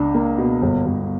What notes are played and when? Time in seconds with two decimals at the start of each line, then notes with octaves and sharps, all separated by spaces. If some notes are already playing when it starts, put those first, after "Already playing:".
Already playing: C#2 D4
0.14 A#3
0.38 B2
0.62 G1
0.86 G1